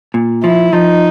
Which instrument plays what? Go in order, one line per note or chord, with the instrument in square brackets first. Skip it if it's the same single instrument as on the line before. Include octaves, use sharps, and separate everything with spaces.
[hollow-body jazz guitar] A#2
[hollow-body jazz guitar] F3 [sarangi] E4
[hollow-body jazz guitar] F3 [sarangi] D#4